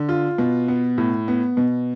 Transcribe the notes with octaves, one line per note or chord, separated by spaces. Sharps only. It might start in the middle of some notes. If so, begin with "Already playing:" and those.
Already playing: D3
F4
B2
B3
A2
B3
B2